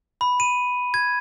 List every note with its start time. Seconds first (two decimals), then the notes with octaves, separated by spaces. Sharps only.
0.21 B5
0.40 D#7
0.94 G#6